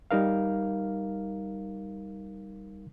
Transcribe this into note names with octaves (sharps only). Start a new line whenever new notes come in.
G3 D#4 A#4 F5